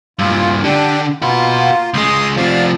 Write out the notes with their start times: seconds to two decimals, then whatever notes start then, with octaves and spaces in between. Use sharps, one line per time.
0.19 G2 A#2 F4
0.64 D3 D4 G4
1.22 A#3 F4 F#4 B4
1.94 C#2 G#3 C6 D#6
2.37 C3 F3 D5 F5